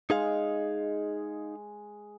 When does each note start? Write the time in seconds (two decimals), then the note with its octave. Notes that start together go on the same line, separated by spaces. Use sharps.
0.10 G#3 D#4 G#4 F5